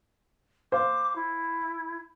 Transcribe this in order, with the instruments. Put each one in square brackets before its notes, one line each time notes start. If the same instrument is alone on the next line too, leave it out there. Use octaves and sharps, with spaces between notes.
[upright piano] C5 F5 [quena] D6
[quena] E4